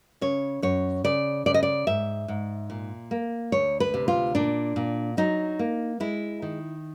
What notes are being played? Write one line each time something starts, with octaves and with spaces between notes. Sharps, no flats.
C#3 C#5
F#2 C#5
C#3 D5
C#3 D5
D#5
D5
G#2 E5
G#2
A#2
A#3
D2 C#5
B4
C3
F4
A#2 D4
A#2
F#3 D#4
A#3
G#3 E4
D#3